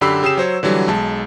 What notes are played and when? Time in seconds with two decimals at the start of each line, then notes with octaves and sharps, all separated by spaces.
0.01 F#2 D3 G4 B5 E6 C7
0.23 C#3 G4 D#6 C7 E7
0.37 F#3 C5 C#5
0.63 D3 E3 F#3 G3
0.88 B1 G#3 A5